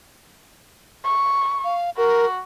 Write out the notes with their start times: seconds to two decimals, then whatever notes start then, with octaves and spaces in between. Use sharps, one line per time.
1.05 C#6
1.64 F5
1.97 F#4 A#4